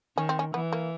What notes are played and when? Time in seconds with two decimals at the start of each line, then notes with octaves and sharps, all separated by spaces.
0.17 D#3 C#4
0.29 C4
0.39 C#4
0.54 E3 B3
0.73 A#3